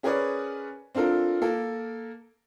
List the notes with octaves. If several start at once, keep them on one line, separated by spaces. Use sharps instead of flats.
C#4 G#4 A#4 B4 C#5 D5
C4 D4 F4 A4 A#4
A#3 A4 A#4